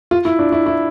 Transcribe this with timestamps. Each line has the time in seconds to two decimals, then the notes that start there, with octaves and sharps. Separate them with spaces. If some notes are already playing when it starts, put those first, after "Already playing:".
0.11 F4
0.25 E4
0.39 D4
0.52 E4
0.66 E4